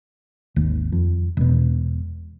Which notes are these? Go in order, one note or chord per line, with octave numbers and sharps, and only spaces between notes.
G#1 D#2
F2
E1 B2